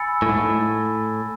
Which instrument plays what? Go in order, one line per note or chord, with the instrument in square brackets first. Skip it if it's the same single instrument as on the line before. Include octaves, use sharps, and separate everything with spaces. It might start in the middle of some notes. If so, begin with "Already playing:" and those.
Already playing: [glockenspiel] G#5 B5 E6 A6 C#7
[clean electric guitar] A2
G#2
A2